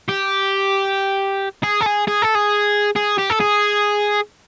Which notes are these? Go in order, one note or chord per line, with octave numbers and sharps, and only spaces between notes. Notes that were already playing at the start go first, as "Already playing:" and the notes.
G4
G#4
A4
G#4
G#4
A4
G#4
G#4
G4
A4
G#4